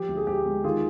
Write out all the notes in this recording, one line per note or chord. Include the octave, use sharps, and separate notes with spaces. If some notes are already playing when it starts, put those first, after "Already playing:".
Already playing: F3 G4
D2
G#4
D2 G4
G#3
D#3 F4 G#4